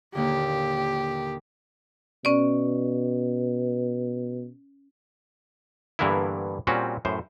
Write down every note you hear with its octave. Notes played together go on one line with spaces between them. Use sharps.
D#2 A#2 D3 G4
B2 C#4 D5
G2 D3 E3 A#3 B3 E4
A#2 G3 C4 C#4 F#4
F#2 A2 C5